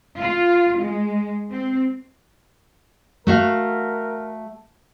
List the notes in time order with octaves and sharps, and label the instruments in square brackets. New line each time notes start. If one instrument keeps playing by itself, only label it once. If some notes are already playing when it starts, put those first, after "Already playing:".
[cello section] F4
G#3
C4
[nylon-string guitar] A3 F#4 F5 [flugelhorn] A#4